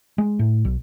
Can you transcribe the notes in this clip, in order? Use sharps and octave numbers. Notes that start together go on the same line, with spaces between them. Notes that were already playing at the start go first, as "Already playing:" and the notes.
G#3
A2
B1